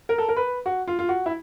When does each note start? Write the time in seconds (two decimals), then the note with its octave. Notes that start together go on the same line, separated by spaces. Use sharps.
0.09 A#4
0.18 A4
0.29 A#4
0.37 B4
0.66 F#4
0.88 F4
0.99 F4
1.09 F#4
1.26 E4